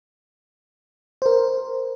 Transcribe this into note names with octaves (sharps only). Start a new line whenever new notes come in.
A#4 C5